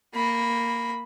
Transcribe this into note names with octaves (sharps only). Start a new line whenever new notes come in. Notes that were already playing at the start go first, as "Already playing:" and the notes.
A#3 B5